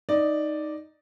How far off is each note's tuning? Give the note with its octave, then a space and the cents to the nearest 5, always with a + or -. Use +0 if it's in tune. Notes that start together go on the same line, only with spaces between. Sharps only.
D#4 +0 D5 +0